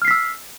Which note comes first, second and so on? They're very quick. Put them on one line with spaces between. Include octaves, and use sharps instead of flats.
F6 C7 B6 E6